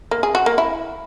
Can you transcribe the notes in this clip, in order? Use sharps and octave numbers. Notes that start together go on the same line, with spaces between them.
A#3
G#4
F#4
A#3
E4